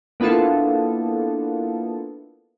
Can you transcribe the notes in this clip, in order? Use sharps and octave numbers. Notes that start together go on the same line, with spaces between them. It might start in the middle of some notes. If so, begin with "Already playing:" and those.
A#3 B3 D4 E4 F4 A4